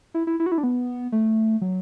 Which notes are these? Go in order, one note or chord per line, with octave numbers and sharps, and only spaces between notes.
E4
E4
E4
F#4
E4
D4
B3
A3
F#3